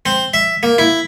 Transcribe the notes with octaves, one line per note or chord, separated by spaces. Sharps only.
C4
E5
A#3
E4